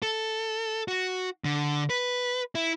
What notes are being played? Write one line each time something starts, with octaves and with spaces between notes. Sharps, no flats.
A4
F#4
D3
B4
E4